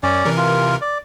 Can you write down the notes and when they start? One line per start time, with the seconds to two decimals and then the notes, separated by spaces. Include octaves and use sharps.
0.03 F#2 C#4 D5
0.25 C3 E3 A#4
0.37 F4
0.81 D5